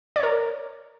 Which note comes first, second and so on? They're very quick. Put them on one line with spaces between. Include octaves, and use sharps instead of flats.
D5 C#5 A#4